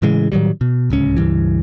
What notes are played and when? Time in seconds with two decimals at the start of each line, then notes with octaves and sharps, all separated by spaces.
0.02 A2 C#3 E3 G#3
0.32 A2 D#3 F#3 G3
0.61 B2
0.90 D1 C#2 C#4
1.17 C#2 G2 E3